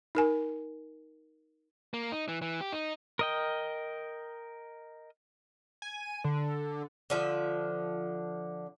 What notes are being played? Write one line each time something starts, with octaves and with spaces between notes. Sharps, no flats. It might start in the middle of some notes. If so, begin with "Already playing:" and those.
D#4 A#4 G#5
A#3
D#4
E3
E3
G4
D#4
A#4 D#5 G5
G#5
D3
D3 F3 E5